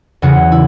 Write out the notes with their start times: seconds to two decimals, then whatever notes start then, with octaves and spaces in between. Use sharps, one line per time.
0.22 E2 C#3 F#3 F#4
0.52 E4